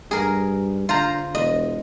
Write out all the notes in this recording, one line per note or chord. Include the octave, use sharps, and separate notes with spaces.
G2 G#4 A#4
D3 F4 C5 A#5
E1 D#5